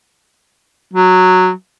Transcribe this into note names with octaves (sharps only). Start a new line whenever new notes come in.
F#3